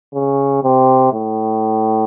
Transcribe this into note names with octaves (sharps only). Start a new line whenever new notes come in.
C#3
C3
A2